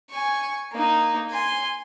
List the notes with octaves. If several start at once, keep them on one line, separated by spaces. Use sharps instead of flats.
G#5 C#6
A#3 D#4
G#5 C6